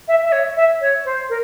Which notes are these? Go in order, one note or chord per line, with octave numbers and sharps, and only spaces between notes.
E5
E5
C#5
E5
C#5
C5
A#4